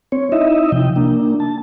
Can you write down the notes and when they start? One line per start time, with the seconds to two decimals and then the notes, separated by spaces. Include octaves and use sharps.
0.12 C4 C#5
0.32 D#4 E4 D#5 E5
0.72 C3 F3 G5
0.96 A#3 D4
1.40 A5